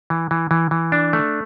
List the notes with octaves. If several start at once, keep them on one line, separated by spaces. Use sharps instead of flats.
E3
E3
E3
E3
D4
A3